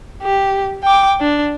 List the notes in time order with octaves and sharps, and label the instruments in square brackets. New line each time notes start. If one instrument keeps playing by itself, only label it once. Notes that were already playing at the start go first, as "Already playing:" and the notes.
[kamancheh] G4
G5 D6
D4